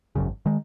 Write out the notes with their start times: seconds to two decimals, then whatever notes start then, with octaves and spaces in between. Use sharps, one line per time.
0.15 G#1 F#2 C#3
0.46 D#3 G#3